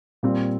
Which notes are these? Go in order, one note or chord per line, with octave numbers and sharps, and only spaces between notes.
A#2 G3 C4 F4